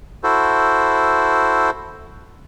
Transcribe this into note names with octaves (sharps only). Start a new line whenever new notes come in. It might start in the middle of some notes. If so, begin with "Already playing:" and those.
E4 F#4 A4 C5